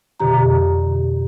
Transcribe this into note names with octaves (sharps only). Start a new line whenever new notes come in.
F2 B2 D3 G4 A#5